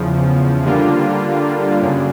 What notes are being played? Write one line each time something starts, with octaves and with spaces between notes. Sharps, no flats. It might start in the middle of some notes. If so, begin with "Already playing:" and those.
Already playing: E2 C#3 F3
D3 G3 A#3 D4 F4
F#2 C#3